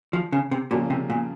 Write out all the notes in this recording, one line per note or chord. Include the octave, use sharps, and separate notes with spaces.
F3
C#3
C3
F2 A#2 C#3 G3 A#3 C#4
C3
A#2